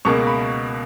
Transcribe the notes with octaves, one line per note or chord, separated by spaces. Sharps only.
C#2 B2 A#3 C#6
B5